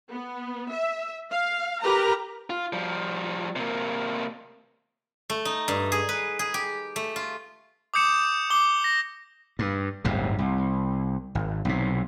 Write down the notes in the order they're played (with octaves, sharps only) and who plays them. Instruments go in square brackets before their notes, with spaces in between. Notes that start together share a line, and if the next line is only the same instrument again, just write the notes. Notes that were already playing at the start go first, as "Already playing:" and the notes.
[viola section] B3
E5
F5
G4 A#4 B4 A#5
[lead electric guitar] F4
F3 G3
C3 A#3
[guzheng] A3
D#4
G2
G#4
B4
G#4
G4
A3
F4
[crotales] D6 D#6 G6 C#7 E7
D6 G7
A#6
[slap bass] G2
D1 G1 G#2 C3
C2
G#1
B1 C3